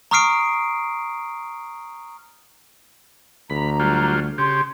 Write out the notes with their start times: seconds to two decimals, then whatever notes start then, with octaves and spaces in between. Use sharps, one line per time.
0.11 A#5 C#6 D#6 F6 C7 D7
3.50 D2 A#5 B5
3.79 F#3 G3 F4
4.38 C#3 G4 C6